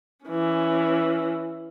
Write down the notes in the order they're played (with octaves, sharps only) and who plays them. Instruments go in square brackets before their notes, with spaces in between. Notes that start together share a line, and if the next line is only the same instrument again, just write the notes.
[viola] E3 C#4